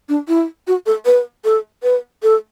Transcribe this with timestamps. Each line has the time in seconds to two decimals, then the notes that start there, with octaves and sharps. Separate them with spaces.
0.09 D4
0.28 E4
0.67 F#4
0.86 A4
1.05 B4
1.44 A4
1.83 B4
2.23 A4